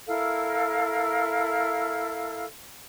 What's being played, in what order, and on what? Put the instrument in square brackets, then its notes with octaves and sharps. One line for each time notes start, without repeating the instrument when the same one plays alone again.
[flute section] E4 A4 A#4 F5